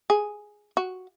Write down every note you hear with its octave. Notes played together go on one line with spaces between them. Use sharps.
G#4
F#4